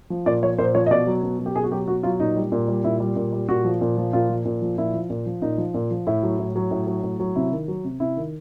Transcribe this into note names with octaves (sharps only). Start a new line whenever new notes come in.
F3
A#2 D5
F3 C#5
A#2 C5
F3 C#5
D#5
B2 D5
F#3
B2
F#3
G4
B2 G#4
F#4
F#3 G4
B2 F#4
F#3 F4
A#2 D#4
G3
A#2
G3
A#2 E4
G3
A#2
G3
A#2 F#4
F3
A#2
F3
A#2 F4
F3
A#2
F3
A#2 E4
F3
A#2
F3
A#2 D#4
F3
A#2
F3
A2 E4
F#3
A2
F#3
A2
F#3
A2
F#3
C3 E4
D#3
F#3
C3
C3 E4
D#3